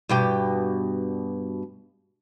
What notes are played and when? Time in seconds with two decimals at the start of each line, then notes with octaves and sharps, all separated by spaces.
0.09 G2 B2 G4